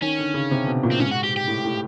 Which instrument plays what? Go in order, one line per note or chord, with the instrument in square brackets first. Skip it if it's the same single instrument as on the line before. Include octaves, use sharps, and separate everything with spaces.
[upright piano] D#3 [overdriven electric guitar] C#4
[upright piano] D3
C#3
C3
B2
A#2
[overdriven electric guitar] C4
[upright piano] G#2 [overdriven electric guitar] C#4
[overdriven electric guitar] F#4
G4
G4
[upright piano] A2
A2